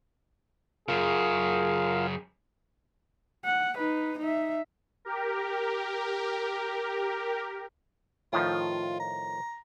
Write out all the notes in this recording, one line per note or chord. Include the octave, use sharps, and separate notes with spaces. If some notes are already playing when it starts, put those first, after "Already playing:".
F#2 C#3 F4 G#4 A#4 F5
F#5
D#4 B4
D#4 E5
G4 A#4
A2 D#3 F3 F4
A#5